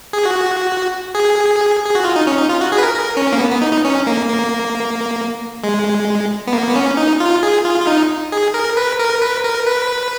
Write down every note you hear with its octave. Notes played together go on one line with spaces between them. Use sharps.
G#4
F#4
G#4
G#4
F#4
F4
D#4
C#4
D#4
F4
F#4
G#4
B4
A#4
A#4
C#4
A#3
B3
B3
D#4
D#4
C#4
A#3
A#3
G#3
B3
A#3
B3
C#4
D#4
F4
G#4
F4
F4
D#4
G#4
A#4
B4
A#4
B4
A#4
B4